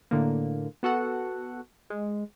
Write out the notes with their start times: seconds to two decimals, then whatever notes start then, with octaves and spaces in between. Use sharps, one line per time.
0.11 A2 D3 A#3
0.83 B3 F#4 A4 F#5
1.90 G#3